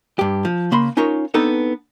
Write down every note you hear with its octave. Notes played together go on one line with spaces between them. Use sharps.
G2 G4
F3
C#3 A#3 B5 C6
C#4 D#4 F4 A#4 C#5
B3 C4 D4 D#4 A4 B4